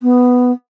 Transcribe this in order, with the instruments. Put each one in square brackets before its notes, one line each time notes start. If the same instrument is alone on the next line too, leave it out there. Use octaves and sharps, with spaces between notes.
[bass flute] B3